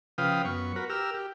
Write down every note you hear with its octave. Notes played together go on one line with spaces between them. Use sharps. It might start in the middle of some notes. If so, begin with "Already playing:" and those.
C#3 F3 B4 F5 G5 D#6
F#2 B3 C#6
F#4 A#4 B4
G4 A#4 E6 F6
G4